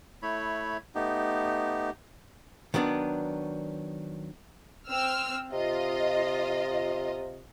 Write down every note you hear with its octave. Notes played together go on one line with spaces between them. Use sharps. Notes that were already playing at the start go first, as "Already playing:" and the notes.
A3 E4 C#5 B5
A3 B3 D#4 G4
D#3 F#3 B3 D4
C4 E6 F6
C3 F4 D#5